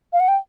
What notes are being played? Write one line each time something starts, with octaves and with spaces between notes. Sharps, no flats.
F5
F#5
G5